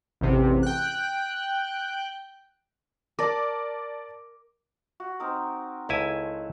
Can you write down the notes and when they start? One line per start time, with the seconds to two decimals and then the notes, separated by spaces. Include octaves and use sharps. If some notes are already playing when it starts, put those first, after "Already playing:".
0.21 A1 E2 C3
0.63 G5 F#6
3.19 A#4 D5 A5 D6
5.00 F#4
5.20 C4 D#4 A#4
5.89 C#2 A3 E4 G#5